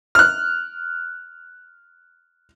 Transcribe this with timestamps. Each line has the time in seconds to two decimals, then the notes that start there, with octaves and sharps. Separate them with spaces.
0.15 F6 F#6